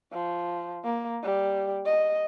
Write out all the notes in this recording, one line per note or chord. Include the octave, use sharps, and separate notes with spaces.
F3
A#3
G3
D#5